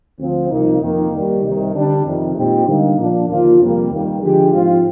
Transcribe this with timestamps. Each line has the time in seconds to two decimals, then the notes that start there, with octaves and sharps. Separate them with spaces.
0.19 D2 D3 F3 C4
0.50 C2 C3 F3 A#3 D#4
0.81 F2 D#3 A#3
1.12 D#2 D#3 G3
1.42 C2 C3 D#3
1.73 D3 G3 D4
2.05 F2 C3 D#3
2.36 A#2 G#3 C4 D#4 G4
2.66 D3 G3 A#3 D#4
2.97 A#2 F3 A#3 D4
3.28 D#2 D3 F3 A#3 F4
3.60 F2 C3 G3 A#3
3.91 D#2 D#3 G3 A#3
4.21 D3 F3 G#3 D4 G4
4.53 G#2 F3 C4 F4